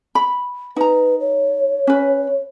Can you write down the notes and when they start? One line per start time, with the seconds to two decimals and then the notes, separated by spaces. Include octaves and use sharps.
0.15 B5
0.76 D#4 B4 A#5
1.20 C#5
1.87 C#4 B4